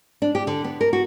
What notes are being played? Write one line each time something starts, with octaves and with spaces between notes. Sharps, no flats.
D4
G4
D3
B3
A#4
F#4